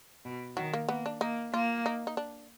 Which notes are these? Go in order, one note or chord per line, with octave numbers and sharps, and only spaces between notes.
B2
D#3 F#3
A#3
A#3 B3
D4
A#3 D#4
A#3 F4
D#4
D#4
D4